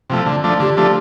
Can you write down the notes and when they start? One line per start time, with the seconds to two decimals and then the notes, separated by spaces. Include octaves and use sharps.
0.10 C3 F3 A3
0.26 D3
0.44 F3 A3 D4
0.60 D3 G4
0.77 F3 A3 D4